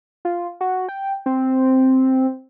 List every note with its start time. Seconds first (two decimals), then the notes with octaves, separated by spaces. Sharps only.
0.25 F4
0.61 F#4
0.89 G5
1.26 C4